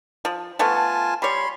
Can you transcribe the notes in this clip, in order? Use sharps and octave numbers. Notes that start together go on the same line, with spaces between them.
F3
F3 A3 B3 F4 G#5 A5
G3 C#5 B5 C6